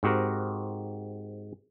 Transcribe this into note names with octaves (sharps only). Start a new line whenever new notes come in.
G#2 C4 F#4 G4 A#4 C5